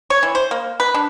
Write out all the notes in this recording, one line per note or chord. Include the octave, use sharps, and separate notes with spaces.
C#5
E3
C5
A#3
B4
D4